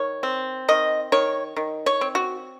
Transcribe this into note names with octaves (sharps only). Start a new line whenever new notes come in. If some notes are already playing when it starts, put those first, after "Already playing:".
Already playing: D#3 C#5
C4
D#3 D#5
D#3 C#5
D#3
C#5
C4
F#4